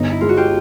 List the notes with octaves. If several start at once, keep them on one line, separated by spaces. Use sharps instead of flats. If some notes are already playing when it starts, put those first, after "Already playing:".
Already playing: G1 D#4
E4
G#3 F4
F#4
F4 G4